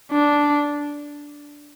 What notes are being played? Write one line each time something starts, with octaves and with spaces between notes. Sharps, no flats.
D4